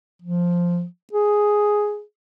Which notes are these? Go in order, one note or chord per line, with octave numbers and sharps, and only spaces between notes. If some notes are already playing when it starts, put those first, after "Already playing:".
F3
G#4